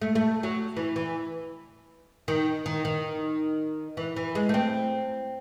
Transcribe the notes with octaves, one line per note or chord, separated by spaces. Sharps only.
A3
A3
F#3
E3
E3
D#3
D#3
D#3
E3
E3
G#3
A3
C4